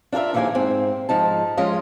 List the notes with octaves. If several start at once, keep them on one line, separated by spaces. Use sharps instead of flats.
D4 F4 G#4 A#4 E5
D#2 E3 F3 A#3 G#4 G#5
G#2 C4
G#2 F3 D#4 A5
F3 G#3 C#4 F4 D#5